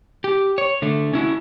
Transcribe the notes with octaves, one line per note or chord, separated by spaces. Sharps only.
G4
C#5
D3 A3
C#4 E4 F#4